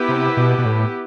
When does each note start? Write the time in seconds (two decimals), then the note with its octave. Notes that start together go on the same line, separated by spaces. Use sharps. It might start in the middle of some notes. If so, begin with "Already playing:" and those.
Already playing: B3 E4 G4 B4
0.09 C3
0.37 B2
0.58 B2
0.65 A2